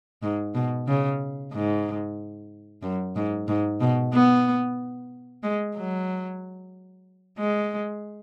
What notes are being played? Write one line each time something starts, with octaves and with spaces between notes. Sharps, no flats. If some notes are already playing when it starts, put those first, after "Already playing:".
G#2
B2
C#3
G#2
F#2
G#2
G#2
B2
B3
G#3
F#3
G#3